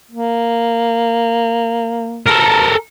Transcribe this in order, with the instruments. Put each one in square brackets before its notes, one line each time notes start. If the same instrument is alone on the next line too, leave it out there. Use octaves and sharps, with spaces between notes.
[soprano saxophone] A#3
[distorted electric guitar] A4 A#4